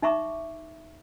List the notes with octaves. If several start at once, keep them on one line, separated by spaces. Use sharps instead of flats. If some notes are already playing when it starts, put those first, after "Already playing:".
D#4 E5 A#5 C#6 D6